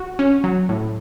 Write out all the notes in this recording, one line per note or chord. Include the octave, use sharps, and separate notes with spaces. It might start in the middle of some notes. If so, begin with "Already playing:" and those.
Already playing: F#4
C#4
F#3
A2